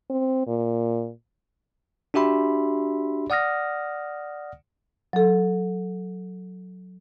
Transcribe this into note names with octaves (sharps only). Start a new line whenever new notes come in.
C4
A#2
D4 F#4 G4 E5 B5 C6
D5 F#5 D#6 F6 A#6
F#3 A4